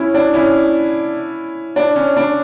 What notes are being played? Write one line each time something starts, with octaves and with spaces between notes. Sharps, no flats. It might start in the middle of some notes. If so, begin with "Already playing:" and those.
Already playing: C#4 E4
D4
C#4 E4
D4
C#4
D4